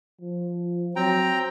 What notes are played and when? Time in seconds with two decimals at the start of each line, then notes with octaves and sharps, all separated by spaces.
0.21 F3
0.96 F#3 C4 G5 A#5